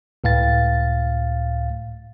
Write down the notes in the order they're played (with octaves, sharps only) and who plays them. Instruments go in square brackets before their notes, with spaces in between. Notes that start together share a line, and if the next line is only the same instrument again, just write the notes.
[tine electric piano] C#2 A2 F5 A6